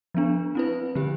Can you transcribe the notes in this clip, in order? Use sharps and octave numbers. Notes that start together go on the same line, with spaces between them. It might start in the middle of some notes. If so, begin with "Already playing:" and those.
F3 B3 D4
C4 E4 B4
D3 F3 C4 G4